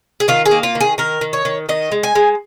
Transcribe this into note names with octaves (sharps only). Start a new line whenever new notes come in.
G#4
D#3 F4
G#4
A#3
F4
D#3
G#4
D#3 A#4
D#3
C#5
D#3
D#3 D#5
G#3
G#5
G#3